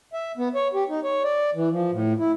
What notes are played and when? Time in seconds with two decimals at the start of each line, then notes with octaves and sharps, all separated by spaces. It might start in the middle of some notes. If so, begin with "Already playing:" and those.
0.13 E5
0.37 B3
0.55 C#5
0.74 G4
0.89 D#4
1.04 C#5
1.24 D5
1.54 E3
1.71 F3
1.92 A2
2.18 E4